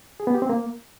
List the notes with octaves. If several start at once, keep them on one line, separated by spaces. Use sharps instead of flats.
G#4
B3
G4
C4
A#3